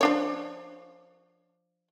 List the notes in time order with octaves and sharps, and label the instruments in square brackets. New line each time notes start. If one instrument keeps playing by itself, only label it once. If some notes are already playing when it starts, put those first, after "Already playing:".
[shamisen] F3 D4 C#5